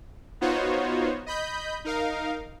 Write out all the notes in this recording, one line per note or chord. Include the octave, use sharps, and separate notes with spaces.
B3 D#4 F4 F#4 C5 C#5
D#5 B5 G6
D#4 A#4 F5